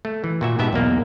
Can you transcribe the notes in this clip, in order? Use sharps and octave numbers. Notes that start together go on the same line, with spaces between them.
A3
E3
A#2 F#4 E5
G#2 B2 B3 G4 E5 A5
B1 E2 A#3